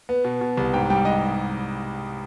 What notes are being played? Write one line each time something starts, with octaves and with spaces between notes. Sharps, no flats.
B3
B2
B2
C2
G#2 G5
G3 G5
G#2 D#5